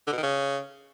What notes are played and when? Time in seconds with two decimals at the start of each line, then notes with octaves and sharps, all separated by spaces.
0.07 D3
0.12 B2
0.18 D#3
0.23 C#3